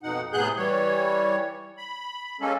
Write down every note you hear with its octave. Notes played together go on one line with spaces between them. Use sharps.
F2 B2 D#4 F#5
A2 C3 B3 G#4 F#6 G6
E3 G3 C#5
B5
G#3 A#3 C#4 A4